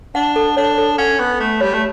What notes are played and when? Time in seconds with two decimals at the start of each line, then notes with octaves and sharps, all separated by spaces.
0.15 D4 F#5
0.36 A4
0.57 D4 C#5
0.78 A4
0.98 C#4 F#5
1.19 B3 C#6
1.40 A3 C#6
1.61 G3 C#5
1.74 A3